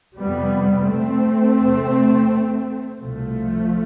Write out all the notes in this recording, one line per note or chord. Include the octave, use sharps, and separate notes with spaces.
F2 C3 G3 B3
A3 C4
E2 C3
C2 B2 F3 A3